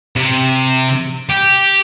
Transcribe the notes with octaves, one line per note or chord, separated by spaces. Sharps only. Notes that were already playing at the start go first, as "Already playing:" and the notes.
C3
G4